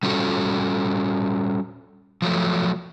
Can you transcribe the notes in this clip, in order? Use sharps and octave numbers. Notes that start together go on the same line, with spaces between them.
G3 C#4 F4 F#4 A4
F3 F#3 A3